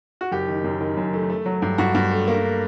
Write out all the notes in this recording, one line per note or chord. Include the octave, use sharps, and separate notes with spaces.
F#4
F#1 G4
D#3
F#2
D#3
F#2
A3
A3
F#3
G2
G2 F#4
G2
A3
A#3